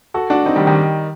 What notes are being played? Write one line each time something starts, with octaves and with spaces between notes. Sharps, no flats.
F#4 A4
D4 F#4
C4 D#4
D#3 G3
D#3 G3